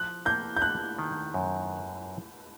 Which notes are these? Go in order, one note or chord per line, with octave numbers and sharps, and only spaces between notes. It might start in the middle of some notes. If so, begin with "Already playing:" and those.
Already playing: F3 F#6
A#3 G6
G6
D4 F#6
D#3
F#2